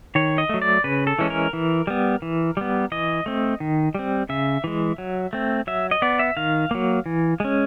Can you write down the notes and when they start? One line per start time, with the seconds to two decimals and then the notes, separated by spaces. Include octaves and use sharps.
0.15 D#3 C#5
0.38 D#5
0.49 F#3 A3
0.62 D5
0.84 C#3 B4
1.07 A4
1.19 E3 G#3 C#4
1.30 A#4
1.53 E3
1.87 G3 B3
2.22 E3
2.57 G3 B3
2.92 E3 D#5
3.26 A3 C4
3.60 D#3
3.95 G3 C4
4.29 C#3 E5
4.64 E3 G#3
4.98 F#3
5.33 A3 C4
5.67 F#3 E5
5.91 D#5
6.02 B3 D5
6.19 E5
6.37 D#3 F5
6.71 F#3 A#3
7.06 E3
7.40 G#3 C#4